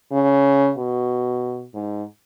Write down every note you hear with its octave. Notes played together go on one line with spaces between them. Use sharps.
C#3
B2
G#2